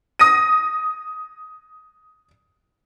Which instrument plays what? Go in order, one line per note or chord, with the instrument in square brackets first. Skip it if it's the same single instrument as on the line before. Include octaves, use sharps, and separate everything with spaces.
[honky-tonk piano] D#6 A#6 D#7